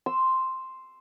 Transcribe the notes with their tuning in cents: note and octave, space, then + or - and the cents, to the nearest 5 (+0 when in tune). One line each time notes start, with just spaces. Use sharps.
C6 +0 E6 +0